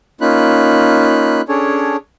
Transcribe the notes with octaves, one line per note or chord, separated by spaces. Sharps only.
A#3 C#4 D#4 F4 B5 F#6
C#4 D4 G#4 A4 C#5